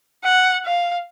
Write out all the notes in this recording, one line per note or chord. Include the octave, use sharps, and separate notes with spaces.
F#5
F5